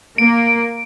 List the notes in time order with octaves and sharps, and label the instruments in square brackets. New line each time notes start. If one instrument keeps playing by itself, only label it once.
[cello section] A#3 [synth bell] D7